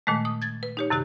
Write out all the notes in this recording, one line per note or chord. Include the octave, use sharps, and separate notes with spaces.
A#2 D#3 G#3 A3
D#6
G#6 A6
B4
D#4 G4 C#5
F#2 C3 D#3 G4 F#6